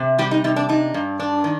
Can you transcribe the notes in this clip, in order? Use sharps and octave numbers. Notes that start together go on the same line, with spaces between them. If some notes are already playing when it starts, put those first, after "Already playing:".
Already playing: C3
G3 G4
D#4
C3 D#4
D4
D4 D#4
G2
D4
D#3